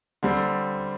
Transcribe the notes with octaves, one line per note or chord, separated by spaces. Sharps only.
D3 G3 C4